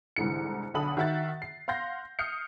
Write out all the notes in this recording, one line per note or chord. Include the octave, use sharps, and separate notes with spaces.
C2 G#2 D3 E3 C#7
B1 D3 A5 B5 D#6 F#7
D#3 F#4 E5 F#5 A6
C7
F5 F#5 C6 G6 A#6 C7
D#6 F6 G6 C7 C#7